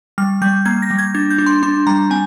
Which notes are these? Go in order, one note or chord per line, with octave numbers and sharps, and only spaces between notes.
G3 F6
G3 G6
A#3 G#6
A#6
G3
G#6
D4 G#6
G6
D4
C6
D4 C6
G3 A#5
C4 G#5